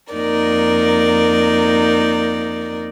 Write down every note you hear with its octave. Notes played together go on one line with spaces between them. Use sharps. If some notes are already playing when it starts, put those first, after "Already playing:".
F2 A#3 D#4 A#4 D5